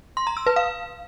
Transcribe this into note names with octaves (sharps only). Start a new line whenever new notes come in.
C6
A#5
E6
B4
F5